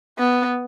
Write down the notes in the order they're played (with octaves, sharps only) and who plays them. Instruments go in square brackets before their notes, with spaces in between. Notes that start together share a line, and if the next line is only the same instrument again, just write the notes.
[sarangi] B3